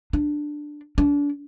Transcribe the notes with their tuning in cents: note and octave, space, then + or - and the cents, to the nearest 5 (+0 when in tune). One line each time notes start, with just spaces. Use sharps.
D4 +5
D4 -35